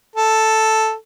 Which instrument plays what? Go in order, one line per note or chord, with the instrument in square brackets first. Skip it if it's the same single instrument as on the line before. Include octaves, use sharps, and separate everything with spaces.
[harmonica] A4